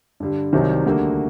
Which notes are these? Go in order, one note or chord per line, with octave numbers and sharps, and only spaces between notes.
G2 D3 G3
C2 C3 D#3 F#3 C4
D2 D3 G3 A#3 F#4